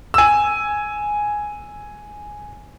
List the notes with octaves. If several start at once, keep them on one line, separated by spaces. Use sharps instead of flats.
G#5 E6